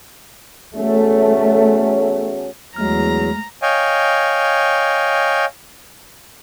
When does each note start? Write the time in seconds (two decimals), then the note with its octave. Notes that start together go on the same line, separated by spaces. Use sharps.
0.75 E2 F#3 A3 C#4
2.76 E2 F#3 G#3 A3 A#5 F6
3.62 C#5 D#5 F5 G5 G#5